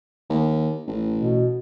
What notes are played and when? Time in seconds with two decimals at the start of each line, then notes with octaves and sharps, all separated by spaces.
0.30 D#2
0.87 A1
1.16 B2